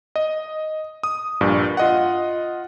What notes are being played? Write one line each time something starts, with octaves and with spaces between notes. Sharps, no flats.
D#5
D#6
A#1 G2 A#2
F4 D#5 F#5